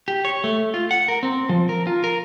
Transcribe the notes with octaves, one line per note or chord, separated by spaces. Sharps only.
G4
C#5
A3
F4
F#5
A#4
C4
F3
A#4
F4
A#4